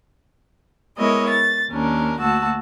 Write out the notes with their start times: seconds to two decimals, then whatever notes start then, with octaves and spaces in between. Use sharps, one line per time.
0.99 G#3 B3 E4 A#4 C#5 D#5
1.30 A6
1.71 D#2 C#4 D4 A#4
2.19 D2 A#3 F#4 A5 E6